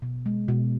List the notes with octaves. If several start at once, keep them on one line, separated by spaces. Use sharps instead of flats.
B2
G#3
B2